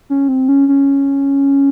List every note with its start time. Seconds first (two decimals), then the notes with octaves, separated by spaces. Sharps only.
0.10 C#4
0.28 C4
0.49 C#4
0.68 C#4